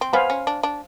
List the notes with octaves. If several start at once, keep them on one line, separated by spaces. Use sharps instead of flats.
C4
B3 C5 F5 G#5 B5
C#4
D4
D4